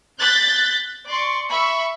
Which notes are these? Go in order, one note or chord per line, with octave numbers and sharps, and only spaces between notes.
F#6 G6 A6 B6
D5 C6 C#6
E5 B5 C#6